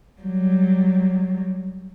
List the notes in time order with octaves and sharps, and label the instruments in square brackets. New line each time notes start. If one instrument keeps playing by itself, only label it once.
[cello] F#3 G3